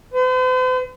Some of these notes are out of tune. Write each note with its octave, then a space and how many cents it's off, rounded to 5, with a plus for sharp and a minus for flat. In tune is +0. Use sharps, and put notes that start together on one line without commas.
C5 -45